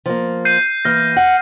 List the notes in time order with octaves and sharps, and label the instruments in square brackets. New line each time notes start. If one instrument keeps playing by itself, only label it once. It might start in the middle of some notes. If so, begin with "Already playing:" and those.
[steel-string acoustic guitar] F3 A#3
[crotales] G6 C7 D#7
[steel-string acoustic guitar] E3 A#3 [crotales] F6 A#6
[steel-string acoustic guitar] F#5